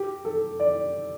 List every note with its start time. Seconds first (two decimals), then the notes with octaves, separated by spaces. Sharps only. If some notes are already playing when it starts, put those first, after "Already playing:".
Already playing: G4
0.25 A4
0.60 D5